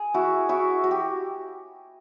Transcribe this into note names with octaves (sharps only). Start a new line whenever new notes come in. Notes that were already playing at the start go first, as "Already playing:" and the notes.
Already playing: G#4
E4 F#4
E4 F#4
F#4
G4